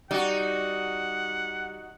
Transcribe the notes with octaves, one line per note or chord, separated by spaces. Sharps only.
G3 D#4 F#4 F#5